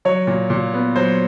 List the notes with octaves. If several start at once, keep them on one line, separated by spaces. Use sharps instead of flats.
F#3 C#5
A#2
A#2
B3
F#3 C5